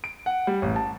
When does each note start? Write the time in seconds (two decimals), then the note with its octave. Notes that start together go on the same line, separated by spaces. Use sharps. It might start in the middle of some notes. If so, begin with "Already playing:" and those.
0.04 D7
0.26 F#5
0.47 G3
0.62 A1
0.76 A5